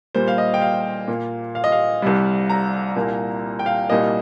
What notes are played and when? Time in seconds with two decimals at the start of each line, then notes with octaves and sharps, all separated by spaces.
0.15 A#2 G3 A#3 C5
0.28 F5
0.38 D#5
0.54 G5
0.62 F5
1.08 A#2 A#3
1.55 F5
1.64 D#5
1.72 F5
2.02 C2 C3 G3
2.49 A#5
2.96 C2 A#2 A#3
3.59 G5
3.66 F5
3.89 C2 A#2 G3 A#3 D#5